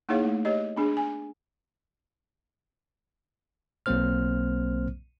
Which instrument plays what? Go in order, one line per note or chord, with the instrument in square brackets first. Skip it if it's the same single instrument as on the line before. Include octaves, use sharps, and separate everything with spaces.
[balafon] A#3 D#4 E4 G#4 C#5 F5
A3
G4 C#5 D#5
B3 D4 G#4
G#5
[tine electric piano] B1 F#3 A#3 C4 C5 F6